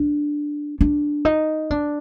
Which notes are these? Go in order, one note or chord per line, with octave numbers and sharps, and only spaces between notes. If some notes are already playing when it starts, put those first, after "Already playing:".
Already playing: D4
D4
D#4
D4